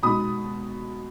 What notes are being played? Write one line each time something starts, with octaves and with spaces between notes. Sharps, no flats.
B2 G#3 D#4 B5 D#6